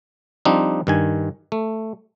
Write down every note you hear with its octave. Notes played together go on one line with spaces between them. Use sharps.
F3 G3 C4 D4 D#4
G2 D#3 G#5
A3